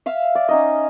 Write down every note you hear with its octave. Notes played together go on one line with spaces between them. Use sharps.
E5 F5 E6
D5
C#4 D#4 D#5